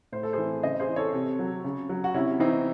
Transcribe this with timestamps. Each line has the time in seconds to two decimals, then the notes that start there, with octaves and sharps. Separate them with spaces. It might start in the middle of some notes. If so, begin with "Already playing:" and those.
0.12 A2 C5
0.23 A4
0.33 E3 G#4 C5
0.63 C#3 C5 D#5
0.80 G#4 C5
0.89 E3
0.96 A4 C#5
1.13 C3
1.39 F#3
1.64 C#3
1.89 F#3
2.04 F#4
2.14 C3 C#4 E4
2.39 E3 C4 D#4